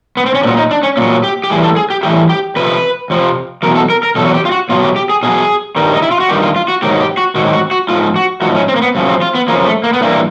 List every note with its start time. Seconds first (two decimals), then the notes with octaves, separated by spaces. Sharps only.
0.17 B3
0.26 C4
0.35 C#4
0.43 A#2 F#3 D4
0.57 D#4
0.71 D4
0.83 C#4
0.97 A#2 F#3 C#4
1.23 G4
1.44 G4
1.49 A2 E3 G3 G#4
1.63 A4
1.76 G#4
1.90 G4
2.03 A2 E3 G3 G4
2.29 G4
2.56 F2 C3 F3 B4
3.10 F2 C3 F3
3.63 E2 B2 F#3 A#4
3.76 A4
3.90 A#4
4.03 A#4
4.16 E2 B2 F#3 A4
4.26 F#4
4.34 G4
4.45 F4
4.51 F#4
4.69 B2 F#3 F4
4.82 G4
4.96 G4
5.10 G#4
5.23 B2 F#3 G#4
5.76 G2 D#3 G3
5.94 D#4
6.02 E4
6.11 F4
6.20 F#4
6.29 G2 D#3 G3 G4
6.42 F4
6.56 F4
6.68 F#4
6.82 G#2 D#3 F#3 G4
7.00 G4
7.17 F#4
7.35 G#2 D#3 F#3 F#4
7.48 G4
7.53 F#4
7.71 F#4
7.89 G#2 F3 F4
8.16 F#4
8.42 G#2 F3 F#4
8.55 C#4
8.68 C4
8.76 A#3
8.82 B3
8.95 F#2 C#3 F3
9.09 C4
9.22 F4
9.35 B3
9.48 F#2 C#3 F3 A#3
9.66 A3
9.84 A#3
9.93 B3
10.01 G2 E3 G3 A#3